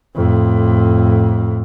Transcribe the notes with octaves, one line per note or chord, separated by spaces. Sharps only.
F2 A2